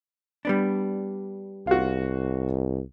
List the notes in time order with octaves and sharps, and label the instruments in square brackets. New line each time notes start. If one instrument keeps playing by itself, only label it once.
[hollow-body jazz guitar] G3 B3 D4
[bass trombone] C2 [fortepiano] F4 F#4